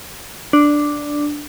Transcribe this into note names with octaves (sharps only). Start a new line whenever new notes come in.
D4